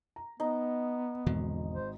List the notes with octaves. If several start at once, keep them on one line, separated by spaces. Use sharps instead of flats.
A#5
B3 D#4
G#1 E2 B2 D3
C5